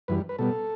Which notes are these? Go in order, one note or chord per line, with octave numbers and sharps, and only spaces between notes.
F#2 E3 G3 B4
B4
B2 G3 B3 A4